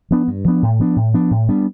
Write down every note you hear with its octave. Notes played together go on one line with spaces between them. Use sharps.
F3 B3 D4
G2
F3 B3 D4
A2
F3 B3 D4
A2
F3 B3 D4
A2
G3 B3 D4